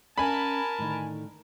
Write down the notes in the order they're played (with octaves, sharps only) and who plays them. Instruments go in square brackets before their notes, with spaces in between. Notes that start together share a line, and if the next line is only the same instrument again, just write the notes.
[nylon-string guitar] C#4 D#5 F#5 [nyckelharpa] A#4 A5 [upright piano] G#5 B5
[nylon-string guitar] A2 D3 D#3